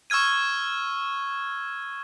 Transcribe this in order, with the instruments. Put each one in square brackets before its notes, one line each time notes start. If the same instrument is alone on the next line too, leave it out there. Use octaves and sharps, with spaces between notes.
[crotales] C#6 E6 F6 G#6 D#7